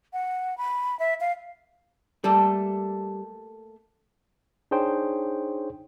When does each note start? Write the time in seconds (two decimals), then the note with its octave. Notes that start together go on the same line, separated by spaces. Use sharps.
0.13 F#5
0.58 B5
0.99 E5
1.21 F5
2.24 G3 A3 A#3 A4
4.71 D4 D#4 G#4 C5 C#5 G5